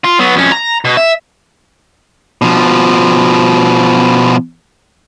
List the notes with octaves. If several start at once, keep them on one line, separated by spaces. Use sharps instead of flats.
F4
F#3 B3
F2 C#4
A#5
B2
E5
B2 F3